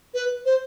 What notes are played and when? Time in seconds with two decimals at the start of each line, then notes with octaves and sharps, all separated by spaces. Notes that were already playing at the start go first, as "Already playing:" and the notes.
0.14 B4
0.45 C5